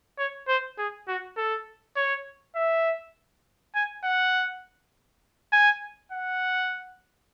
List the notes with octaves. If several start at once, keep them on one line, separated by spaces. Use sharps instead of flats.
C#5
C5
G#4
F#4
A4
C#5
E5
G#5
F#5
G#5
F#5